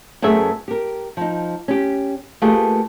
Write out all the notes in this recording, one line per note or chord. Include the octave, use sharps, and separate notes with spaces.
F#2 A3 B3 G#4 E5
G4 A#4
F3 D#4
C#4 G4
A3 A#3 F4 G4 G#4 B4